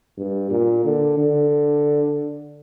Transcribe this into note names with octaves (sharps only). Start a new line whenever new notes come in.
G2
A#2
D3
D3